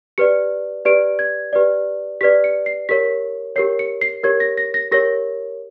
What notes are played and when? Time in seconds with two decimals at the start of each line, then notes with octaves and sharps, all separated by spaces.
0.18 G4 B4 D5 C#7
0.85 G4 B4 D5 D7
1.19 G#6
1.53 G4 B4 D5
2.21 G4 B4 D5 B6
2.44 C#7
2.66 C7
2.89 G4 A#4 C#5 B6
3.56 G4 A#4 C#5 C7
3.79 C#7
4.01 C7
4.23 G4 A#4 C#5 G#6
4.40 A#6
4.57 A#6
4.74 A#6
4.91 G4 A#4 C#5 A#6